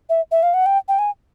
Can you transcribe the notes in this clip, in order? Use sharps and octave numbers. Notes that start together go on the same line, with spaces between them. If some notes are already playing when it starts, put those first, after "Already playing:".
E5
E5
F5
F#5
G5
G5
G#5